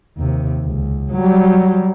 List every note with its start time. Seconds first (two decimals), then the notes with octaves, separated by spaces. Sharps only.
0.17 D#2 C3
0.63 C#2
1.12 F#3 G3